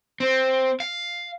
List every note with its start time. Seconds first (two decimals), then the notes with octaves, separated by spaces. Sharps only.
0.20 C4
0.80 F5